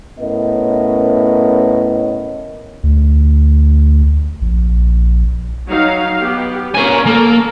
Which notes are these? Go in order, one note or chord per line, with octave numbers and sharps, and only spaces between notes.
A2 B3 C#4 A#4 D#5
D2
A#1
F#3 D#4 F5
B3 G4
A#3 C#4 G#5
A#3 A4 A#4